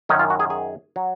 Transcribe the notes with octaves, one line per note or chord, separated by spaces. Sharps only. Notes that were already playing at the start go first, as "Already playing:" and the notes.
F#2 D#3 F#3 C#4 D#4
F4
F#4
G#4
G#4
F#3